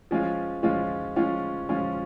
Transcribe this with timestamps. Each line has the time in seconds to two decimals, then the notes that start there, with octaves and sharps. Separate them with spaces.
0.11 F3 G#3 C#4 F4
0.63 F3 G#3 C#4 F4
1.16 F3 G#3 C#4 F4
1.69 F3 G#3 C#4 F4